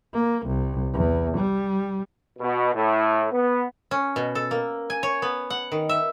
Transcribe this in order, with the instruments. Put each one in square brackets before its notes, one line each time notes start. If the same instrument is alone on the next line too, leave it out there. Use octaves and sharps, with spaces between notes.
[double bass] A#3
C2
E2
G3
[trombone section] B2
A2
B3
[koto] C#4
B2
A4
A#3
G#5
C#5
B3
F#5
D#3
E5